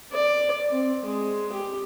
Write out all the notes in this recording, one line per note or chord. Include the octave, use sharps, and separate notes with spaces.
D5
C4
G#3
G4